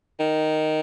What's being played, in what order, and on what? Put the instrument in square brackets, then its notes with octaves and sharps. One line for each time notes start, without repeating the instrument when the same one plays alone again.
[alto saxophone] D#3